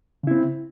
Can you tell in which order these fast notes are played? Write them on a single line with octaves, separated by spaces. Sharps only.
C#3 E4 C4